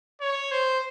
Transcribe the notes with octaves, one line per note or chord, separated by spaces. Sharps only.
C#5
C5